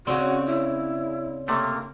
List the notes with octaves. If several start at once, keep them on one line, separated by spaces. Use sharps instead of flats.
C#3 C4 C#4 F#4 C#5 D5
E4
C3 A3 A#3